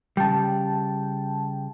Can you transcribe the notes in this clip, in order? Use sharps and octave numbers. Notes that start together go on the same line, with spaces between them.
C#3 G3 G5 A5